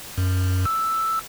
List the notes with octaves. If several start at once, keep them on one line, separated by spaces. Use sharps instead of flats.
F#2
E6